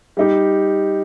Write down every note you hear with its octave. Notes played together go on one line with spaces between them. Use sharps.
G3 D#4 G4